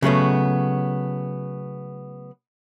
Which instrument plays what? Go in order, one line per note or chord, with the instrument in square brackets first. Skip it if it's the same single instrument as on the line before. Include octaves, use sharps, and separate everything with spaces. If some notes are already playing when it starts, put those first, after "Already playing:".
[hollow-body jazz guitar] C#3 F#3 A3 B3